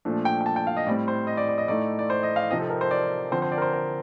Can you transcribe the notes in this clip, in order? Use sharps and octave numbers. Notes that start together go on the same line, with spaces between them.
A#2 F3 A3 D4
G5
G5
A5
G5
F5
D#5
A2 G3 C4 D5
C5
D#5
D5
D5
D#5
A2 A3 D#4 D5
D5
C5
D#5
F5
C3 F3 C4 D#4 D#5
A4
A#4
C5
D5
D3 F3 C4 C5
C5
D5
A#4
C5
A#4